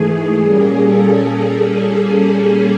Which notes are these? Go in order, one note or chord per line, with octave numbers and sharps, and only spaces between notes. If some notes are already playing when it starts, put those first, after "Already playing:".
Already playing: G#2 E3 A3 G#4
A#2 G3 A#3 C#4
A4